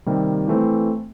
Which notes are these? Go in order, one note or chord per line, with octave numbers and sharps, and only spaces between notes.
C3 D#3 G3 A#3
E3 A3 C4